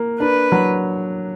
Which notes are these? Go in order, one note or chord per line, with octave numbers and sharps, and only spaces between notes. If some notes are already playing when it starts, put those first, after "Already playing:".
Already playing: A#3
D4 B4
F#3